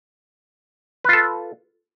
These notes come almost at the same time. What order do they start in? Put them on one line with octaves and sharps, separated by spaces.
B4 F4 A4